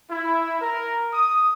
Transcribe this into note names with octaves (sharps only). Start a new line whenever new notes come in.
E4
A#4
D#6